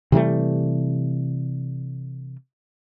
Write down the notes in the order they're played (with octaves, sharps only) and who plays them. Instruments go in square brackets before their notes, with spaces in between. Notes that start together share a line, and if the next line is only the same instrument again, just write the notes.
[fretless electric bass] C3 E3 G3 A3